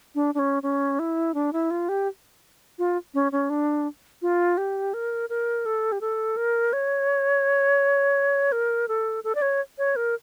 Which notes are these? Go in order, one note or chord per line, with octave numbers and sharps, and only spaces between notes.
D4
D4
C#4
C#4
E4
D4
E4
F4
G4
F4
C#4
C#4
D4
F4
G4
A#4
A#4
A4
G4
A4
A#4
C#5
A#4
A4
A4
D5
C#5
C#5
A#4